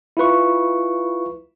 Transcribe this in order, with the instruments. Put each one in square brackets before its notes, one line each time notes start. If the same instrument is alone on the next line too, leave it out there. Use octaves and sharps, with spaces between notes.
[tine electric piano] E4 F4 B4 C#6